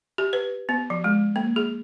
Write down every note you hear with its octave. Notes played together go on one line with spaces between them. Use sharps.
G4
B4
B3
F3
G#3
A#3
G#4